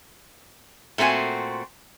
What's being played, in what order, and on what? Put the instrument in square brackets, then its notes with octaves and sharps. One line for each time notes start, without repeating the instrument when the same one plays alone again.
[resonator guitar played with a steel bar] A#2 A3 C4 F#4 G#5